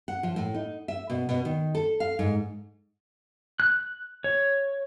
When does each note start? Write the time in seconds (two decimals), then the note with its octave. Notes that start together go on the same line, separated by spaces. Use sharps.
0.08 F#5
0.23 F3
0.36 A2
0.54 D#4
0.88 E5
1.10 B2
1.29 B2
1.45 D#3
1.75 A4
2.00 F5
2.19 G#2
3.60 F#6
4.24 C#5